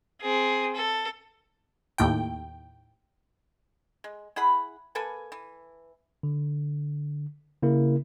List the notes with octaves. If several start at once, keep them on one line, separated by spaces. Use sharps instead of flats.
C4 G#4
A4
D#2 A2 G5
G#3
E4 G#4 F#5 B5
A#3 A4 B4 G#5
E3
D3
C#3 A#3 E4 A#4